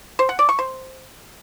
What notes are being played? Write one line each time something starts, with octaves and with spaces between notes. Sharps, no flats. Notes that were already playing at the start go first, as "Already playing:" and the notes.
C5
F#5
D5
C#6
C5